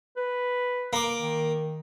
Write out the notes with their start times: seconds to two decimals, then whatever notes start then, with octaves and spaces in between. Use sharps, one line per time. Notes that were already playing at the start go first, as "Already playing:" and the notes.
0.16 B4
0.93 A#3 D6
1.20 D#3